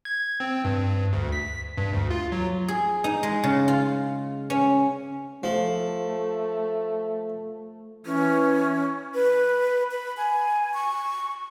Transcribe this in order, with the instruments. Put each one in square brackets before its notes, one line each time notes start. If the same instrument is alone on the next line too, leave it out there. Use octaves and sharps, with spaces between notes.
[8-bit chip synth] G#6
C4
G2
D2
B6
G2
D2
F4
F#3
[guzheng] G#4
D#4
G#3
C#3
F4
C#4
[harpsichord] F3 [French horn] A3
[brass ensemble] E3 [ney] C#4
[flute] B4
B5
G#5
C#6